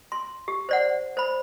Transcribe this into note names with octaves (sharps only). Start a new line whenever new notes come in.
C6
G4
C5 D5 F#5
C5 B5